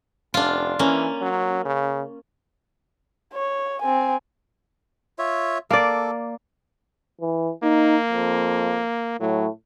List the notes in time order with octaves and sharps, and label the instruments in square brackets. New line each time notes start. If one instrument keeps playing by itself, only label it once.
[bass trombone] F1 [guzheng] D4 F4
[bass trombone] E3 [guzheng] A#3 C#4
[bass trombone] F#3
C#3
[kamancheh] C#5
C4 G#5
[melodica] F4 C#5 E5
[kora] A#3 D5 [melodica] A4
[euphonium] E3
[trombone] A#3 [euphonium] D#4
[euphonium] F2
[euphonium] A2 [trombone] F#3